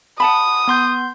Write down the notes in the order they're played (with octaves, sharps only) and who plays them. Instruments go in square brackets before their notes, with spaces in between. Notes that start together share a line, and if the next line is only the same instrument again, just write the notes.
[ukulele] F#5 A5 B5 [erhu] D#6
[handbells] B3 C6 G6